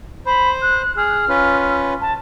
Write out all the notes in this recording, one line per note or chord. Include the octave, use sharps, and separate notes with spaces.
C5 B5
F#6
G#4 F6
C#4 F4 B4
A5